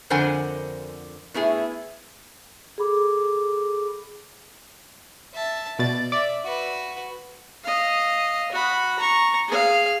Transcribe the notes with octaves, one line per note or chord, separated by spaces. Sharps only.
F2 D3 A#4 C5 F#5 G#5
A2 B3 E4 G#4
G#4 A4 B5 D6
E5 A5
B2 D5 A6
D5 E5
F#4 B4
D#5 F5
F#4 B5
A#5 C#6
G#4 F5